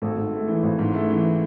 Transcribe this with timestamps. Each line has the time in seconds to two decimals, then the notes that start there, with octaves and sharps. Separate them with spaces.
0.02 G#1 A4
0.17 G#2
0.33 A3
0.48 E3
0.63 G#1
0.79 G#2
0.94 A3
1.10 E3